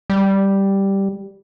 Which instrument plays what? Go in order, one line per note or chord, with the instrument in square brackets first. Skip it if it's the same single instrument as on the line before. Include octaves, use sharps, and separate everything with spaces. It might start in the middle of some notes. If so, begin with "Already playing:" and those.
[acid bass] G3